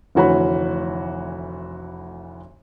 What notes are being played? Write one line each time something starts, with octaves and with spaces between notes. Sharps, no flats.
F1 D2 E3 F#4 C#5 B5